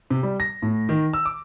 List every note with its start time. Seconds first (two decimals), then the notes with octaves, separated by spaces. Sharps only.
0.10 C3
0.23 G3
0.40 A#6
0.62 A2
0.89 D#3
1.13 E6
1.25 D6